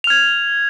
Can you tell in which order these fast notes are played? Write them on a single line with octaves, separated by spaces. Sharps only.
F7 F6 G#6